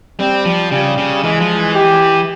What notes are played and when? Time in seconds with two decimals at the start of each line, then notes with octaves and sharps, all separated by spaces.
0.20 G3 C4
0.45 F3
0.71 C#3 G3
0.97 C#3
1.23 E3 G#3
1.40 F3
1.58 E3
1.75 G4